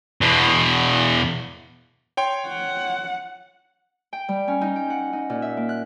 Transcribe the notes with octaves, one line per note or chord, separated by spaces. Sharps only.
E2 B2
C#5 G5 C6
F#5
G5
G3
C#4
D#4
G5
F#5
D#4
A#2
E5
A#3
F#6